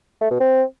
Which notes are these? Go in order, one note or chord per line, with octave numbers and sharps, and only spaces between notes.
A3
B2
C4